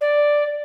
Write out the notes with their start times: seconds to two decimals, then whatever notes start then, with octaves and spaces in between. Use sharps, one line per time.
0.01 D5